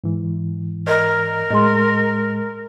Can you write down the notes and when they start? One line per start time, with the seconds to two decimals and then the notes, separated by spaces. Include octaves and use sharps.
0.04 G#2 E3
0.87 A#4 D5 D#5
1.50 A2 G#3 D#5 C6